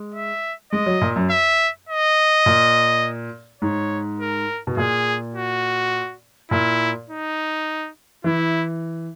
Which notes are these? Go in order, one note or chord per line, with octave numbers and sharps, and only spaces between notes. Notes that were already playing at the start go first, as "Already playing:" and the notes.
Already playing: G#3
E5
G#3 D#5
F#3
A#2
F#2
E5
D#5
A#2
G#2 C#5
A#4
B2
A#2 G#4
F#4
A#2 E4
D#4
E3 E4